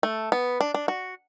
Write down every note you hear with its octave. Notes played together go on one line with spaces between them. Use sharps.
A3
B3
D4
D4
F#4